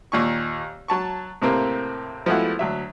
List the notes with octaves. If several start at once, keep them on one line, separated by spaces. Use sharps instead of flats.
D#2 A#2 C#6
F#3 A5 C#6
A2 C3 A#3 C4
F3 G#3 A3 B3 E4 F#4
D2 F#3 E5